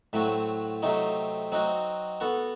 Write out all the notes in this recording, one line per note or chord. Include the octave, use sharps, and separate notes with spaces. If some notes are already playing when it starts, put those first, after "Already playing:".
A2 F#3 A3 C4 F#4
C3 F#3 A3 C4 D#4
F#3 C4 D#4 F#4
B3 F#4 A4